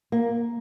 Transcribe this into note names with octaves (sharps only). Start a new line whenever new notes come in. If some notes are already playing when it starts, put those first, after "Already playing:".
A#3